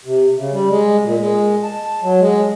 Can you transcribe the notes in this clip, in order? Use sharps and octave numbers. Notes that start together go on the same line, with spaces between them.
C3
C#3
G3
G#3
A#2
G#3
A5
F#3
G#3